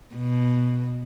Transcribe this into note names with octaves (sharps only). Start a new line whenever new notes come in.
B2